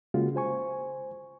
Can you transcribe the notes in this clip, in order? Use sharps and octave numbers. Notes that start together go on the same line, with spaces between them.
C#3 G#3 A#3 F4 F#4
C5 G#5 C#6